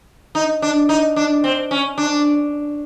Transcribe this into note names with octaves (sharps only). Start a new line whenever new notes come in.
D#4
D4
D#4
D4
C4
C#4
D4